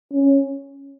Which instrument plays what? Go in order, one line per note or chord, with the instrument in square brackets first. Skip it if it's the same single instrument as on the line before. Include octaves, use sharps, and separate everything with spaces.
[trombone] C#4